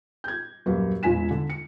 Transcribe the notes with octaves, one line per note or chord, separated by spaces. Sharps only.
G6 G#6
D#1 F#2 A#3 B4
E1 C#2 F4 G#5 B6 E7
D3
C#7